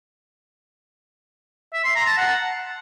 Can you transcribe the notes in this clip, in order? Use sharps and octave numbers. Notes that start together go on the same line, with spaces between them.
E5
C6
A#5
A5
F#5